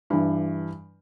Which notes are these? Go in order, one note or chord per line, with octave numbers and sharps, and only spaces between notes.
G2 E3